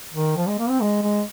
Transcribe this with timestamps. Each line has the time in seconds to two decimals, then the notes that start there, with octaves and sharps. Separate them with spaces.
0.14 D#3
0.36 F3
0.47 G#3
0.59 A#3
0.70 C4
0.81 G#3
1.02 G#3